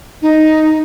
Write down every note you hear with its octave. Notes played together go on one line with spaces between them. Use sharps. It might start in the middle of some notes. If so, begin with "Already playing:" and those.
D#4